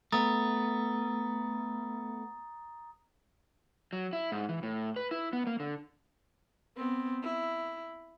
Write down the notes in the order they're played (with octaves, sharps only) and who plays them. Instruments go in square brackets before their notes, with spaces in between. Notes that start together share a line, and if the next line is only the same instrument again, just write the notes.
[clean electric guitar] A3 B3 [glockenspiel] A#5 D#6 A6
[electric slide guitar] F#3
E4
G#2
E3
A2
B4
E4
B3
A#3
D3
[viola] B3 C4
E4